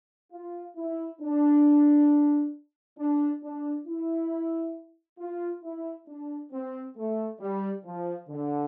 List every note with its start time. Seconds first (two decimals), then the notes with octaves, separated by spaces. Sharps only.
0.33 F4
0.77 E4
1.21 D4
2.98 D4
3.42 D4
3.87 E4
5.19 F4
5.63 E4
6.08 D4
6.52 C4
6.97 A3
7.41 G3
7.85 F3
8.29 D3